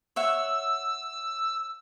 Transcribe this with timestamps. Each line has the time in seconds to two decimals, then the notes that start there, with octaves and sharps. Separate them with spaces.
0.16 C#5 E5 F#5 E6